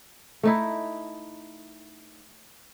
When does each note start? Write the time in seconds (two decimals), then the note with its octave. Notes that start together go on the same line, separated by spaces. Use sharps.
0.43 A3 D#4 E4